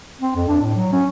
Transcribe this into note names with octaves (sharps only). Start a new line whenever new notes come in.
C4
F2
D4
A2
F#3
C#4